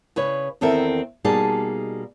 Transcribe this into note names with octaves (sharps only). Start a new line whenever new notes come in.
C#3 B4 C#5
E2 D#3 C4 A4 A#4 E5
B2 G3 A#3 D#4 G#4 A5